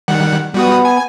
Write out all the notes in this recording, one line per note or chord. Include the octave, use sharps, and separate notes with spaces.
D#3 G3 F#5
G3 B3 F#4 D#6
G#5